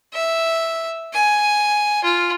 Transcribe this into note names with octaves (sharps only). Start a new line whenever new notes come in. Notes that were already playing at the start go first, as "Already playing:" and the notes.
E5
G#5
F4